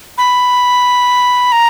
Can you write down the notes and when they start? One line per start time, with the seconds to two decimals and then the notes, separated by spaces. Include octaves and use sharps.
0.18 B5
1.52 A#5